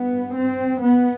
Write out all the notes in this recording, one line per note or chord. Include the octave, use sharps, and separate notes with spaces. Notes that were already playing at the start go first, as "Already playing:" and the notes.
Already playing: G2 B3
C4
B3